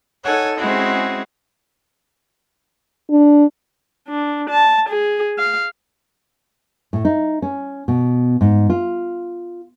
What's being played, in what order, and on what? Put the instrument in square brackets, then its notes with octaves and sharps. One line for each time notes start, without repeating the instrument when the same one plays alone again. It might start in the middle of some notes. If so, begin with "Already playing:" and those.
[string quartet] D#4 A4 C#5 F#5 G#5
G#3 C4 C#4 E4 F#4 G#4
[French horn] D4
[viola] D4
A5
G#4
F5
[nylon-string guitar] A2
D#4
C#4
B2
G#2
F4